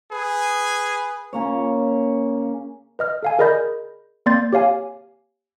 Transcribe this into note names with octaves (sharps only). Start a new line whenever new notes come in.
G#4 B4
C#3 A#3 C#5
B4 D#5 F6
A4 F5 G#5
G#4 A#4 D5 D#5 B5 G6
A#3 C4 D5 C6 G6 A6
G4 C#5 F5 G#5